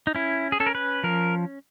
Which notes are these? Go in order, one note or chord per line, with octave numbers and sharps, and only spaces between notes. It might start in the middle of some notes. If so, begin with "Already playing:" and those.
D#4
C#4 E4
G#4
C#4 A4
A#4
B4
F3 A#4